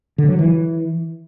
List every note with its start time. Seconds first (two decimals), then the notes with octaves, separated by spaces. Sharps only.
0.18 D3
0.29 F#3
0.39 E3